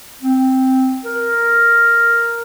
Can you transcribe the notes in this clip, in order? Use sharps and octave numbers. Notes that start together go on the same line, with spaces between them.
C4
A#4